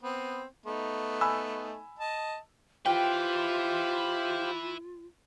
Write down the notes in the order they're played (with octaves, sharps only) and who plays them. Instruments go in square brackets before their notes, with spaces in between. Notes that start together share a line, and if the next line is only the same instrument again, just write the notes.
[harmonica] B3 C4
A3 B3 D#4
[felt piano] G#5 B5 E6
[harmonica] D#5 A5
[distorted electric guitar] E4 B4 [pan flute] F4 [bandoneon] G4 C5 F5 [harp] G5